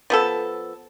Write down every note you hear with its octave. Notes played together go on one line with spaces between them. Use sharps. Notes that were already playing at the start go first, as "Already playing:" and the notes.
F3 B3 A4